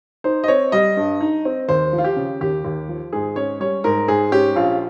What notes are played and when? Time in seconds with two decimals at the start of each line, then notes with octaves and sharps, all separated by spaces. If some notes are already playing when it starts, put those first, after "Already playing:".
0.24 D#4 C5
0.44 D#5
0.48 C4 C#5
0.72 G3 D#5
0.97 G2
1.21 D#4
1.45 C4
1.68 D#2 C5
1.93 F3
1.98 F4
2.04 G4
2.16 C#3
2.41 D#2 G4
2.64 D#2
2.89 F3
3.13 G#2 G#4
3.36 C#4 C#5
3.60 G3 C#5
3.84 G#2 A#4
4.08 G#2 G#4
4.32 C#4 G4
4.56 A#1 F4